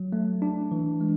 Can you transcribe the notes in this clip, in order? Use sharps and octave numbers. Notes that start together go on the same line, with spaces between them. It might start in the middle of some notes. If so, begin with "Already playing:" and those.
Already playing: F#3
A3
D4
E3
G#3